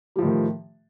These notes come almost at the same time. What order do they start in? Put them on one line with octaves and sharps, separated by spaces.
G3 F3 A2 D#3